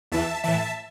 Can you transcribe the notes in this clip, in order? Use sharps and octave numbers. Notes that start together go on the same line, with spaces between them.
E2 E3 E5 A5
A2 E3 E5 A5